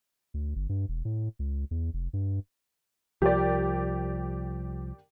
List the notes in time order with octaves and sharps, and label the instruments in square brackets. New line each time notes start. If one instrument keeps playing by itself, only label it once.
[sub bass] D2
G1
G2
E1
A2
C#2
E2
F1
G2
[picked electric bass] C2 F3 [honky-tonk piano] G4 A#4 D5